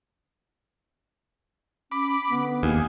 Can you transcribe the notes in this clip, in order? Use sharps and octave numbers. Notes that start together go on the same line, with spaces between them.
C#4 B5 D6
D3 B3
D#2 G#4